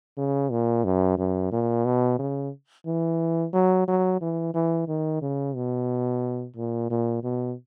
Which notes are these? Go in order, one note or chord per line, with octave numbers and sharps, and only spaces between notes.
C#3
A#2
F#2
F#2
A#2
B2
C#3
E3
F#3
F#3
E3
E3
D#3
C#3
B2
A#2
A#2
B2